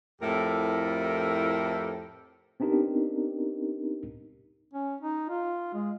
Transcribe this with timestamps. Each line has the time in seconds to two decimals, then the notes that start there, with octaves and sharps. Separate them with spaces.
0.21 F2 A2 E4 G4 A4 A#4
2.60 B3 C4 D4 D#4 G4 A#4
4.74 C#4
5.01 D#4
5.29 F4
5.74 G#3